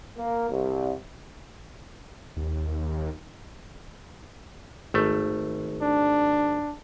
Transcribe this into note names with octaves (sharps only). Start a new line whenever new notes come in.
A#3
C2
D#2
G#1 A3
D4